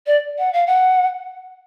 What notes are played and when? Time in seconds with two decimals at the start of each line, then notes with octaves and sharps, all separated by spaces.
0.07 D5
0.39 F#5
0.53 F5
0.67 F#5